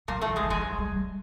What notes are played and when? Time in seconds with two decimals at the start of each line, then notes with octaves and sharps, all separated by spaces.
0.08 A#2 F#3 A#3
0.21 A2 A3
0.29 F3
0.36 G#2 G#3
0.43 E3
0.50 G#2 F3 G#3
0.64 F#3
0.78 G3
0.91 G3